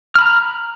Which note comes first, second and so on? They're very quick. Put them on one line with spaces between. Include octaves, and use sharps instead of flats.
F6 B5 A#5